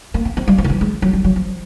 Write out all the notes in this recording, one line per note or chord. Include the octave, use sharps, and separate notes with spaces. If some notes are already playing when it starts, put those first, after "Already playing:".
A#3
C4
C4
G3
F3
D#3
E3
G#3
F#3
G3
F#3
F3